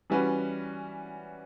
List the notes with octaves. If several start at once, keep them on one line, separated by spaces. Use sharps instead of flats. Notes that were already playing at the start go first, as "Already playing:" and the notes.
E3 G3 C#4 F#4 B4